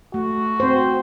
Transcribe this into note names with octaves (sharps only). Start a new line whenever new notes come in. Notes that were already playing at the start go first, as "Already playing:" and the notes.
A3 F#4
C4 C5